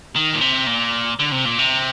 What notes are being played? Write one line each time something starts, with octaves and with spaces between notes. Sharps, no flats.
D#3
A#2
C3
A#2
D3
C3
A#2
C3